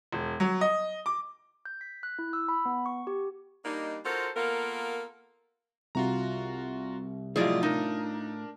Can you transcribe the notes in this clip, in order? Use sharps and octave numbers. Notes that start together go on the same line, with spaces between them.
E1
F#3
D#5
D6
G6
B6
F#6
E4
E6
B5
B3
C#6
G4
G3 A#3 D4 D#4
D#4 F4 F#4 A4 A#4 C5
A#3 B3 F4 A4 A#4
C2 F4 F#4 A#5
A2 F3 F#3 E4 F4 G#4 D5 D#5
D4 D#4 A#4